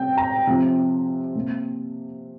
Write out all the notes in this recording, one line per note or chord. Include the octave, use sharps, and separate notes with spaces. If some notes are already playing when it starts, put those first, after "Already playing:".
Already playing: C3 G3 C4 G5
A#5
C3 F3 C4
C3 A#3